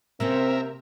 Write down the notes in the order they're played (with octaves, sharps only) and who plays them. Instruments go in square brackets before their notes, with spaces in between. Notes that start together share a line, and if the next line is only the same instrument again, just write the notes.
[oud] C3 A#3 C#4 [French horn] C4 [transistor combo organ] A#4 E5